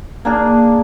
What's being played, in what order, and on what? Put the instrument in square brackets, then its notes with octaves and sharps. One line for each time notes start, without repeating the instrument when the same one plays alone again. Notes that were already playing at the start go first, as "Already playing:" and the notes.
[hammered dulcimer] A#3 D4 G#4